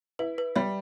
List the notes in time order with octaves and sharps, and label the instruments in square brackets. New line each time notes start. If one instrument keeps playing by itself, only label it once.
[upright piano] E4 [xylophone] B4
[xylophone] B4
[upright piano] G3 [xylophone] E5